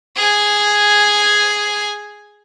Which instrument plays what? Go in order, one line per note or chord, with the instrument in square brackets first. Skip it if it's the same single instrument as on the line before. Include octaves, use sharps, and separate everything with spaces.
[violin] G#4 G#5